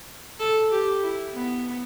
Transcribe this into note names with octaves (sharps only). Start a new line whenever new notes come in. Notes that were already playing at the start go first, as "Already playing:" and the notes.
A4
G4
E4
B3